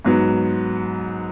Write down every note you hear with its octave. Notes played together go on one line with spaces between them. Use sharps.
G#2 F#3 B3